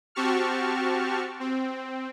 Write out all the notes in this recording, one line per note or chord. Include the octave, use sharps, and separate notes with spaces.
C4 F#4 G4 A5 C#6 F6
C4